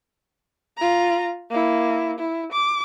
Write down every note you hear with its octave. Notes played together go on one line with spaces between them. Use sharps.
F4 A#5
A#3 E4
E4
D6